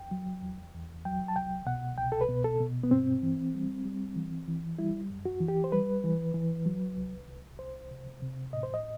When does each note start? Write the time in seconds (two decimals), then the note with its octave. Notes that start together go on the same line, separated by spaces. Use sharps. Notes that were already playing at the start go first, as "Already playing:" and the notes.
Already playing: E2 G5
0.11 F#3
0.42 E2
0.74 E2
1.05 F#3 G5
1.28 A5
1.36 C2 G5
1.66 B2 F#5
1.98 C2 G5
2.12 A4
2.21 B4
2.29 B2
2.44 A4
2.60 B2
2.83 B3
2.91 G2 C4
3.23 E3
3.55 G3
3.85 G3
4.16 E3
4.48 E3
4.79 G3 E4
5.10 F#2
5.25 F#4
5.41 E3
5.48 G4
5.64 C5
5.72 G3 B4
6.04 E3
6.34 E3
6.66 F#3
6.97 C2
7.28 C2
7.59 C2 C5
7.91 C3
8.22 C3
8.53 A2 D#5
8.63 C5
8.74 D#5